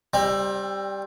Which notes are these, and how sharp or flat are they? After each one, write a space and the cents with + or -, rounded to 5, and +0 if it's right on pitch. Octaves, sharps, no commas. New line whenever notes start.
G3 +0 C4 +30